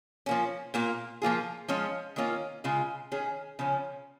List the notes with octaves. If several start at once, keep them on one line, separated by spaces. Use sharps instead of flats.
F3 A#3 C#4
A#2 A#3 F4
F3 A#3 F4 G#4
F3 G#3 C#4 F4
D#3 A#3 C#4 F4
C#3 G#3 F4 G#4
D#3 C#4 G#4
C#3 F3 C#4